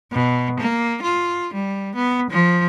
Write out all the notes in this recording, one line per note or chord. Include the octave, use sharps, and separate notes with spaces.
B2
A#3
F4
G3
B3
F3